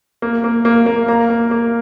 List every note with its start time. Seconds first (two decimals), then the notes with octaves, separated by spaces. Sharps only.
0.22 A#3
0.44 A#3
0.65 A#3
0.86 A#3
1.08 A#3 A#5
1.30 A#3
1.51 A#3